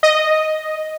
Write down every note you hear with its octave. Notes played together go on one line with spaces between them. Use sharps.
D#5